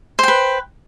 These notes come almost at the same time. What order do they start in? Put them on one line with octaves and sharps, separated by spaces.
C5 G5 B4